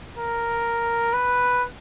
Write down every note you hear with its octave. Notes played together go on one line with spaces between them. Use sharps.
A#4
B4